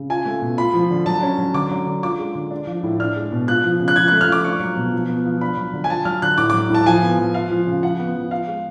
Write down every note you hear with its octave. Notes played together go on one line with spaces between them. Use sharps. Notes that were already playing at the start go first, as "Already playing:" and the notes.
Already playing: C#3
F4 G#5
A3
B2
F4 B5
F3
D3
F#3 A5
C#4
F#3
D3 D6
F#3
D3
F4 D6
G#3
D3
D4
F3
A2
D4 F6
G#3
B2
F4 F#6
F3
C#3
F#6
F3 G#6
F#6
A3
F6
F3 D6
D4 C#6
F#3
B2
F3
B3
F3
D4 B5
F#3
D3
G#5
F4 A5
F#3 F6
D3 F#6
A2 D6
D6
F#3
A2 A5
F3 G#5
B3
F3
F4 F5
F3
C#3
F3 F#5
B3
F3
F4 F5
G#3